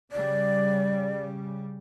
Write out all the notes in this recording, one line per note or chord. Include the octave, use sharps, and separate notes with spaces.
C#3 G3 D5